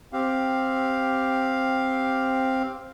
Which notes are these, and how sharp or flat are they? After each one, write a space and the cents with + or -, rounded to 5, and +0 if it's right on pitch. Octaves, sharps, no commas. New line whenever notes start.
C4 +5 G4 +0 F5 +0